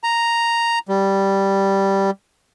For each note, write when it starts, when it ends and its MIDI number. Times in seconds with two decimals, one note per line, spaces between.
0.04 0.79 82
0.88 2.10 55